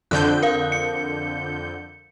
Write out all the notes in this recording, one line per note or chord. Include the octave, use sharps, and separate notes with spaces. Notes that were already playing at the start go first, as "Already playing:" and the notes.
F2 D3 F#6 G6
A#4 F5
C#7